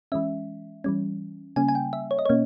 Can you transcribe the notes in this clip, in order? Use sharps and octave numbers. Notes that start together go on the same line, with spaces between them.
E3 G#3 C#4 E5
E3 G3 C#4
C#3 G3 A#3 C#4 G#5
G#5
G5
E5
C#5
D#5
B2 A#3 C#4 C#5